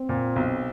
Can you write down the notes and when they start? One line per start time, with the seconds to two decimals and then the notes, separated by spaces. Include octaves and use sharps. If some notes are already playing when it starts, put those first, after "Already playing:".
Already playing: C4
0.09 A#2
0.36 B1